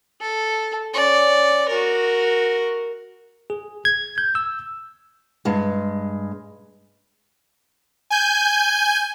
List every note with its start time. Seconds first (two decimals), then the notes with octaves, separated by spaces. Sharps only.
0.21 A4
0.94 C#4 D5
1.68 F#4 A#4
3.50 G#4
3.85 G#6
4.18 G6
4.35 E6
5.45 G2 G#3
8.10 G#5 G6